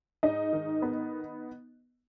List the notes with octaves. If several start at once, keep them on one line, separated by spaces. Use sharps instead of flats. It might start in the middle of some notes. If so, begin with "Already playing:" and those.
G#2 D#4 D#5
D#3
B3